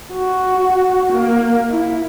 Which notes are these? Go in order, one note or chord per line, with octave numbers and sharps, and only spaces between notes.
F#4
A#3
E4